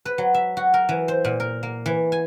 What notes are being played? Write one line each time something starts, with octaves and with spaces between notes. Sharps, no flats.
B4
F#3
E5
F#4
A#4
E3
C5
A#2
A#4
A#3
E3
G#5